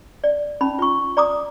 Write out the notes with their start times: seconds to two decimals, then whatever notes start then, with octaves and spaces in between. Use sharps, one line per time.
0.24 D5
0.61 C#4 D#4 B5
0.79 F4 C#6
1.17 D5 A#5 D6 D#6